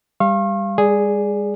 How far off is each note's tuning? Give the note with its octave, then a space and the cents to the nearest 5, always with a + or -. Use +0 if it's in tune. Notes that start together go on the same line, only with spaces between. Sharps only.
G3 +25 F5 -20 C#6 -45
G#3 -45 G#4 +0 D5 +0